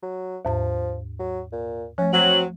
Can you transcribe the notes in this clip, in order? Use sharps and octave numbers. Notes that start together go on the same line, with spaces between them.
F#3
D#2 G#2 F3 A5
F#3
A#2
F3 A3 C#4
F#3 C4 F#7